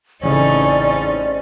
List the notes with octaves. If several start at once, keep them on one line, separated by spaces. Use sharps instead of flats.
A1 C#3 C4 C#4 D#4 A4 D5